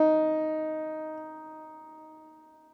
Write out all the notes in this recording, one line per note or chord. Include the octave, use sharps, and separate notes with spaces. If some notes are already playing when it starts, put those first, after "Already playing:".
Already playing: D#4